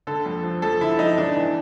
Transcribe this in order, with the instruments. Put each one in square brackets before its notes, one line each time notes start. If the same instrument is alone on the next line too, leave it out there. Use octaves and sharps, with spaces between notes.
[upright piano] D3 A4
F2
F3
F2 A4
D3 E4
F2 D#4
E2 D4
E3